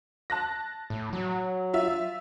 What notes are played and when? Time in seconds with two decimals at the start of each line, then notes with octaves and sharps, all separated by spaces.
0.30 A5 F#6 A#6
0.90 A2
1.13 F#3
1.74 F4 E5